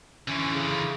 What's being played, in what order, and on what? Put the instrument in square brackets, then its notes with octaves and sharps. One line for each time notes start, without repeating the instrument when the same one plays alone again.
[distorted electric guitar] D3 E3 [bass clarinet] C#4
[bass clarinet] C#3